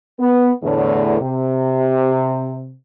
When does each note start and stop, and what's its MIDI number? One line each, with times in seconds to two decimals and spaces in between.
0.20 0.51 59
0.62 1.17 40
0.62 1.17 45
0.62 1.17 50
1.20 2.74 48